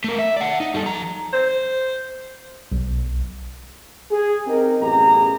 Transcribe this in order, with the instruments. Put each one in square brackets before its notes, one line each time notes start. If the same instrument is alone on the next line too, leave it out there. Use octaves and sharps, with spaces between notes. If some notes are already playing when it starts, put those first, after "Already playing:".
[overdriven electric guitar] A3 A#4
E5
D5 F#5
D#4
G3 A4
F3 A#5
[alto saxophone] C5
[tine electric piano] B1
[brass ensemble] G#4
C4 D#4 G4 A#4
A1 F#2 B3 G4 G#4 A#5